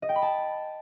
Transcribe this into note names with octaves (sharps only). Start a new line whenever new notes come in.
D#5
G5
B5
A5